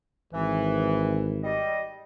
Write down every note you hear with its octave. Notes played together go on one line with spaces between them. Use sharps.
G#1 E3
G3 D#5